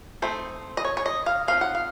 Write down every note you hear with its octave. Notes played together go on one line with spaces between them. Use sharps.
A3 C4 D#4 C5
D#5
C#5
C#5
D#5
F5
F3 C4 D#4 F5
F#5
F5